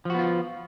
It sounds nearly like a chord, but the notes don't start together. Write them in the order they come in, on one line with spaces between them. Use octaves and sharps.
F3 F#4 B3 F4